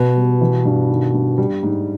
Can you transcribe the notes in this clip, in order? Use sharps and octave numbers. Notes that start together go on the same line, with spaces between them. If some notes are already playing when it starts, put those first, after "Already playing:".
Already playing: B2 B3
G3
E3
G2
D#3
G2
G3
G#2